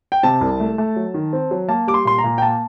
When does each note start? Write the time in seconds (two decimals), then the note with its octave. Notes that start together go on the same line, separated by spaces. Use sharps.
0.12 G5
0.23 C3 A5
0.41 C2
0.60 A3
0.78 A3
0.96 F#3
1.14 D#3
1.33 C4
1.51 F#3
1.69 A#3 A5
1.87 G3 D6
1.94 C6
2.05 A#2 C6
2.18 A#5
2.24 A#2
2.38 G5
2.42 A#3 A5